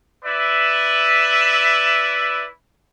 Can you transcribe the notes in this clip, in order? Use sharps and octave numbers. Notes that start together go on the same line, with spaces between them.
E4 B4 D5 E5